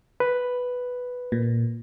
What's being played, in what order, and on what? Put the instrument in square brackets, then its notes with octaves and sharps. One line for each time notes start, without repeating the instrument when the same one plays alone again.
[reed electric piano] B4
[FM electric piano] A#2